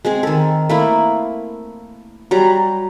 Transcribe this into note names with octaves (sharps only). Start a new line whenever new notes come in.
G#3 C4 G#4
D#3 A4
A3 A#3 E4
F#3 G3 A#5